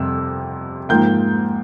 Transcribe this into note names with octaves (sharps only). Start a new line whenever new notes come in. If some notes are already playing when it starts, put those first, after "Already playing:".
Already playing: F2 C3 G3 E6
G#2 F3 A#3 G5 G6